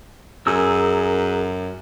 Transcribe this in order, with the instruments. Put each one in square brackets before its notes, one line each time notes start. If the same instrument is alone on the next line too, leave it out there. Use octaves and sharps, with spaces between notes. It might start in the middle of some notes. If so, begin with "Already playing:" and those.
[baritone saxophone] F#2 [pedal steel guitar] G#4 A#4 E6